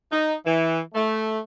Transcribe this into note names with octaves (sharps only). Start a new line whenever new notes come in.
D#4
E3
A3